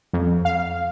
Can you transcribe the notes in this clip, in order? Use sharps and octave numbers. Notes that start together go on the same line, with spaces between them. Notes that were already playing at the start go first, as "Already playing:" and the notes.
F2
F5